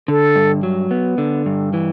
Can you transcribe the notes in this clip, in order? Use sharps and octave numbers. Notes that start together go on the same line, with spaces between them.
D3 A4
G2
F#3
B3
D3
G2
E3